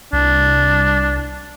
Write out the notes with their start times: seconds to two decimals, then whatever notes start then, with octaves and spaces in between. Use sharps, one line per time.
0.13 C2 D4